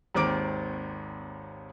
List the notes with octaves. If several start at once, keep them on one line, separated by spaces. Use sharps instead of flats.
G#1 D#2 D#3 C4 D6 D7